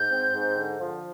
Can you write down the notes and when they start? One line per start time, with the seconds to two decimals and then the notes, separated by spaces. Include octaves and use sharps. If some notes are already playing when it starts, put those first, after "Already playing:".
Already playing: G#2 G6
0.11 C4
0.34 G#2
0.57 D3
0.80 F3